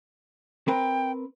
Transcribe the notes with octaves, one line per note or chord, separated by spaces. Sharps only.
C4 A#4 B4 G5